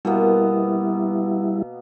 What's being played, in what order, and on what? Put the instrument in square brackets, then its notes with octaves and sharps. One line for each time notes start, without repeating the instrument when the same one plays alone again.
[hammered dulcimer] B2 A#3 B3 [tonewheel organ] G3 E4